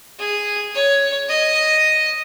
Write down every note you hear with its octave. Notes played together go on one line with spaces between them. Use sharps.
G#4
C#5
D#5